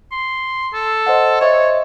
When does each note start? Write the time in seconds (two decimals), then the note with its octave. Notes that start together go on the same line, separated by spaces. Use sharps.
0.12 C6
0.74 A4
1.07 C5 D#5 F#5
1.41 C5 C#5 D#5 E5